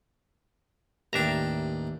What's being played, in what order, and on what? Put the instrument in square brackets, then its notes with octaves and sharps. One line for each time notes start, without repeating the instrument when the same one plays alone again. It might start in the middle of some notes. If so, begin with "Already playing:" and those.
[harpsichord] A1 D#2 G5 [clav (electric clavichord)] D4 E5 A#5